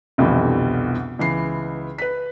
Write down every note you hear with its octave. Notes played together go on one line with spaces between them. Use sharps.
C2 F2 B2 D3 E3 G3
C#2 E3 C7
B4 B6